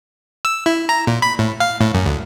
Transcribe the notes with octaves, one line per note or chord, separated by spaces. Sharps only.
E6
E4
A#5
A#2
B5
A2
F5
A2
F#2
D2